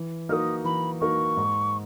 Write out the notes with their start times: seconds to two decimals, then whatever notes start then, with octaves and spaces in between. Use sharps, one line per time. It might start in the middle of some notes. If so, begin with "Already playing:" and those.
Already playing: E3
0.29 A#3 D#4 F#4 A#4 D#6 F6
0.64 E3 B5
1.01 A#3 D#4 F#4 A#4 C#6
1.37 G#2